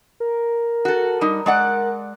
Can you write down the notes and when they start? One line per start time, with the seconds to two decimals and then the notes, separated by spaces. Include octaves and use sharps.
0.20 A#4
0.85 F#4 A4
1.21 G3 D#4
1.46 G#3 D5 F#5